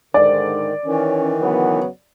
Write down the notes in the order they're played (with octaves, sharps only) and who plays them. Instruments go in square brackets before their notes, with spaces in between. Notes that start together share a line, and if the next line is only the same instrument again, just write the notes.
[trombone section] G#2 D3 [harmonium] D#3 [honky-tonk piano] D5
[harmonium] D#3 E3 [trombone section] C#4
[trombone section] C#3 F#3 B3